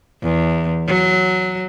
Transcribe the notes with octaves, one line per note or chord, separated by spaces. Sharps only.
E2
F#3